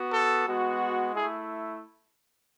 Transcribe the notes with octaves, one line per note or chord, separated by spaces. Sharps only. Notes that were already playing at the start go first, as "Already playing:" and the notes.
Already playing: B3 F#4
A4
G#3 B3 F#4
A3 E4 G#4